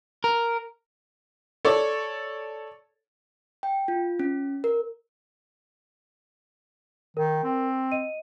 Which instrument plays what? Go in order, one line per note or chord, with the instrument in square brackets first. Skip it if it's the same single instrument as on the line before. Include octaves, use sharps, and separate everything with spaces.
[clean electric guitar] A#4
[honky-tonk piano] A4 C#5 D5
[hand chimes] G5
F4
C#4
A#4
[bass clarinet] D#3 [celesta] A#4
[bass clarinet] C4
[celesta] D#5 D#7